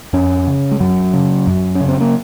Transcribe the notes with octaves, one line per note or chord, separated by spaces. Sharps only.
F2 C#4
C#3
G#3
F#2 F#3
C#3
F#2
C#4
C#3
C4
A#3